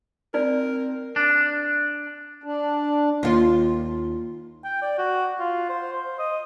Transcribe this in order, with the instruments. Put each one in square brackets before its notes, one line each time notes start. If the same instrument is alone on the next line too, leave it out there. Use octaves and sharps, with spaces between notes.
[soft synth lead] C4 [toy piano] D#4 D5 [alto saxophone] A#4
[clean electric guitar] D4
[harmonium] D4
[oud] D#2 F4
[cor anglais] G5
D5
F#4
F4
C5
C5
D#5